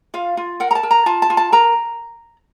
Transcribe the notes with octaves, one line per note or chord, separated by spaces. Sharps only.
F4 F5
F4
A#4 F#5
A#5
A5
A#4
A#5
F4 A5
A5
F4
A5
A#4 A#5